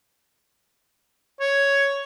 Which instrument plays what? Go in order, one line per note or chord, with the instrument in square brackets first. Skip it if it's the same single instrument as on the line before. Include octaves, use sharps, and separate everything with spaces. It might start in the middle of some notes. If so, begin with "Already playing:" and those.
[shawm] C#5